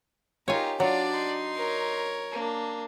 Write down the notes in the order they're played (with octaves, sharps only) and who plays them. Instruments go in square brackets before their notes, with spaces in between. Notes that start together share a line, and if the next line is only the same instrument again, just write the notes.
[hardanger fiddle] D#4 G4 [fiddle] F4 A#4 [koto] C#5 G#5
[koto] F#3 [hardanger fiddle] D4 D5 [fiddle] F4
[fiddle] D#4 C6
[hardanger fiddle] A#4 C#5
[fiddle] A#3 D4